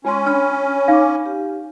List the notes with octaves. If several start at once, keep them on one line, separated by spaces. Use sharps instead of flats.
G#3 C#4 F4 G#5 C6 C#6
D4 C#5 B5 F6
D#4 F5 G#5 D6
G4